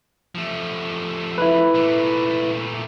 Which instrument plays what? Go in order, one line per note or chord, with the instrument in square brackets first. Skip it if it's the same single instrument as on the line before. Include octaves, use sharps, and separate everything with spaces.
[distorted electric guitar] F3 A3
[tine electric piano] E4 B4
[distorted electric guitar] A#2 A3